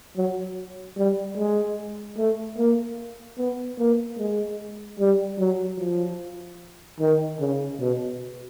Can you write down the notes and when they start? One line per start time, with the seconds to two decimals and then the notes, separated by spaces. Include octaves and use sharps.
0.17 F#3
0.97 G3
1.37 G#3
2.18 A3
2.58 A#3
3.38 B3
3.78 A#3
4.19 G#3
4.99 G3
5.39 F#3
5.79 F3
7.00 D#3
7.40 C#3
7.81 B2